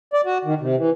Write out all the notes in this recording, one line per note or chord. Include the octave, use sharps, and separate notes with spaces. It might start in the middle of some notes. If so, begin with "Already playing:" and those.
D5
F#4
D#3
C3
E3